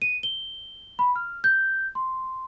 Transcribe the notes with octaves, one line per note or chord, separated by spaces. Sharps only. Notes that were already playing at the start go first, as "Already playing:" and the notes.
D#7
G7
B5
F6
G6
C6